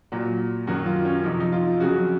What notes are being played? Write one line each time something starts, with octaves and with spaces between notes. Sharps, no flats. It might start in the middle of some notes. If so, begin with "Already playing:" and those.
A#2 F#3
F#2 D#3 F#3 F#4
F4
C#4
F2 C3 F3 D#4
D#4
F4
F2 C#3 F#3 F#4